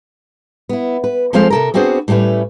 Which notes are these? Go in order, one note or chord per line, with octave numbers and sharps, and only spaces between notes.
B3 E4
B4
F3 G#3 C4 A4 C5 F5
C3 A4 A#4
B3 C4 D4 F#4 G#4 C5
A2 G3 A3 C#4 B4